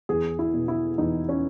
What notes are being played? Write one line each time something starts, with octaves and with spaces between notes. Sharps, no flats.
E2 G#4
E4
B2
E4
E2 D#4
C#4